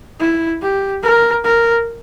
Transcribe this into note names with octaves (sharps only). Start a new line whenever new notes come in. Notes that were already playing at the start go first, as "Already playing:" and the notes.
E4
G4
A#4
A#4